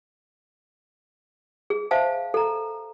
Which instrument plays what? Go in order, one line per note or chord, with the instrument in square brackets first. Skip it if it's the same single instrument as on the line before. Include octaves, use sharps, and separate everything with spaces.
[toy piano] G#4
C5 E5 F5 A5
A4 A#5